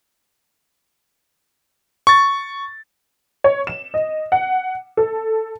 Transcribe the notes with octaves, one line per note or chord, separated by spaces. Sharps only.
C#6 A6
C#5
E7
D#5
F#5
A4